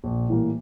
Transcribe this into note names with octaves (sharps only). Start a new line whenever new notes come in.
A#1
A2 E3 G3 A#3